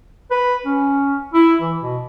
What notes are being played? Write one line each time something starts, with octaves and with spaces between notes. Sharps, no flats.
B4
C#4
E4
E3
B2